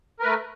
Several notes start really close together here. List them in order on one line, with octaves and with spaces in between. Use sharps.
A#4 B4 A3